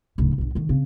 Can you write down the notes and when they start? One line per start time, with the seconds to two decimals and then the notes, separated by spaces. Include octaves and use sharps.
0.18 D1 C#3
0.38 B1 G2
0.55 D3 D#3
0.69 C#3 C4